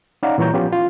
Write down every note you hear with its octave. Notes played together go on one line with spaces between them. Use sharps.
C#4 D#4 D5 F5 F#5 A#5
A#2 E3 G3 C#5 A#5 G6
F3 B3 C#4 F4 G4
F4